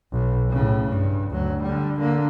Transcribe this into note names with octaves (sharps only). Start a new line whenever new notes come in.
B1
A2 C#3
G2
D2 F#3
D3 G3
D3 A#3